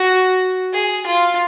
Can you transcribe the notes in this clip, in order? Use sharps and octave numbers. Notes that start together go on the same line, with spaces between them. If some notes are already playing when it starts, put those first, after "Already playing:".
Already playing: F#4
G#4
F4